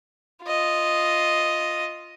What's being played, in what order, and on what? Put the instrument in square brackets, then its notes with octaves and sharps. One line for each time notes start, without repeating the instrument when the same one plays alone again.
[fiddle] F4 D#5